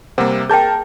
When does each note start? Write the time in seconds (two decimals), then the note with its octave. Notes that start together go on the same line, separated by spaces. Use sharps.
0.18 C3 G3 A#3 C5 F#5
0.50 G#4 A#4 G5 A5 G6